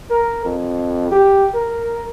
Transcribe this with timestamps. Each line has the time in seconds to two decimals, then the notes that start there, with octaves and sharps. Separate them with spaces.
0.11 A#4
0.45 F2
1.12 G4
1.55 A#4